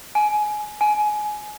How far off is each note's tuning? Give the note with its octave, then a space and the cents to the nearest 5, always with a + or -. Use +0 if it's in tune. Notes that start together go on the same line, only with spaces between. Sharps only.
G#5 +20
G#5 +20